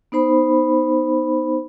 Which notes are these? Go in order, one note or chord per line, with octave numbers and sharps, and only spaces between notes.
B3 D#4 C5 B5